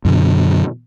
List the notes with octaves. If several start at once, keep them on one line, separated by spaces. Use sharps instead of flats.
F#2 B2 D3